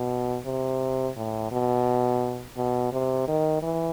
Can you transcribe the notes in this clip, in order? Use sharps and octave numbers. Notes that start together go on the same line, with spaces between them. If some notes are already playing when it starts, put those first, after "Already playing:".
Already playing: B2
C3
A2
B2
B2
C3
D#3
E3